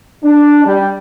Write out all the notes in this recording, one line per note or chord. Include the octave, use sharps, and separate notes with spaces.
D4
G3